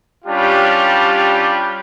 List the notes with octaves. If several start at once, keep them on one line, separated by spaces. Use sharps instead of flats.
G3 C#4 D4 F4 G4